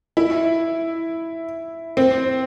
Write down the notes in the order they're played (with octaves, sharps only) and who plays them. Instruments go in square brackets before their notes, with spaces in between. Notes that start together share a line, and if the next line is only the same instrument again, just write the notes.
[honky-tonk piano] E4
C4